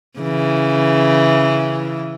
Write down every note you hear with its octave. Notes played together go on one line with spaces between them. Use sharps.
C#3 E3